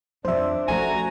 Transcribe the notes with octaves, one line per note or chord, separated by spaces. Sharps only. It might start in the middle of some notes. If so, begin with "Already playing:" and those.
F2 F3 D4 C5 E5
F3 A3 C#4 F#4 G#5 A#5